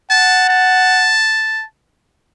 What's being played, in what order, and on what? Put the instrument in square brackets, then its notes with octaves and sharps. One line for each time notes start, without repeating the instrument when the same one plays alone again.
[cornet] F#5 [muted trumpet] A5
[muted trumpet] A5